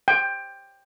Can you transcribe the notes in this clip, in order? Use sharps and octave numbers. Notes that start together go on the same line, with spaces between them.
G5